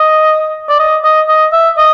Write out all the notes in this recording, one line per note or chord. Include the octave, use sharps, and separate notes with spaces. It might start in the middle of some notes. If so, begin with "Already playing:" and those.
Already playing: D#5
D5
D#5
D#5
D#5
E5
D#5